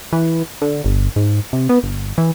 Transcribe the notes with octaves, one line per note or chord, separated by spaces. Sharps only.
E3
D3
G1
G#2
C3
B3
G1
E3